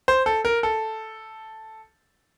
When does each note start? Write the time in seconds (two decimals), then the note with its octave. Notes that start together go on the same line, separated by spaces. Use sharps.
0.08 C5
0.26 A4
0.45 A#4
0.63 A4